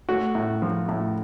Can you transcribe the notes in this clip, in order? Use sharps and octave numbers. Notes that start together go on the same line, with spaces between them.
A3 F#4
A2
F3
A2